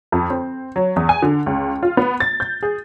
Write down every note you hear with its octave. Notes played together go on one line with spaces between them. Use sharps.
F2
C4
F#3
E2
G#5
D3
C#2
F4
B3
A6
G6
G#4